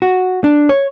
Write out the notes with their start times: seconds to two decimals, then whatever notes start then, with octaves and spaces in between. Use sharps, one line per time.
0.02 F#4
0.44 D4
0.69 C#5